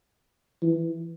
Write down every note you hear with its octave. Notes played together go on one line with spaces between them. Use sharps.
E3